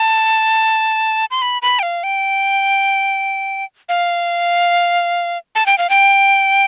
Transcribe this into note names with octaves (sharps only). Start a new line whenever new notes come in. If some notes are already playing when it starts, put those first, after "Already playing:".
Already playing: A5
C6
B5
B5
G5
F5
G5
F5
A5
G5
F5
G5